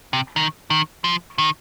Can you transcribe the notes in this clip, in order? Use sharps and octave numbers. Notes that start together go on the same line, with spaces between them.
C3
D#3
D#3
F3
D#3